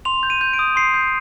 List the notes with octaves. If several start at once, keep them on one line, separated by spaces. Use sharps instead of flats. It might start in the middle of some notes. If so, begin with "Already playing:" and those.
C6 F7
G6
D#7
G6
D7
D#6
C6 C7
G6